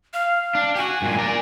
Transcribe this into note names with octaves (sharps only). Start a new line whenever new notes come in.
F5
D4
F#4 G4 G#5
G2 A#2
A#4 D5